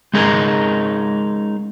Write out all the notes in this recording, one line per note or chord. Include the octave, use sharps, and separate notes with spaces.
G#3 C#4 D#4 G#4 A#4